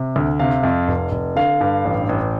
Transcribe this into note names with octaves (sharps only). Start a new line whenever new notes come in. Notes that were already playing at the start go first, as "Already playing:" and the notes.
Already playing: C3
D2
C3 F5
F2
F1
F1
D3 F5
G2
A1
A1